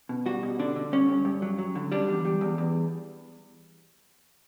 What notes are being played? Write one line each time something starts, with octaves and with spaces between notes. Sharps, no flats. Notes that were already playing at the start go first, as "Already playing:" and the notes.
B2
G3 F#4
B2
D3 D4
D3
G2 C#4
G2
G2
F#3
F#3
D3
G3 D4
E2
G3
E2
E2